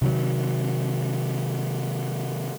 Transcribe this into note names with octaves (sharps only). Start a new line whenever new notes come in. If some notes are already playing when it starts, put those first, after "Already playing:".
C3 D#3 F#3